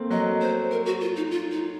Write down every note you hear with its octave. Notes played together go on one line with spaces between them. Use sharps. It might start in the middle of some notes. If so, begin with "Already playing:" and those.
Already playing: A3 A#3 C4
F#3 D#5
C5
A#4
F#4
F4
D#4
F4
D#4